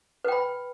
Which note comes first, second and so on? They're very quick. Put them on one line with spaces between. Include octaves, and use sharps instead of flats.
B4 G5 B5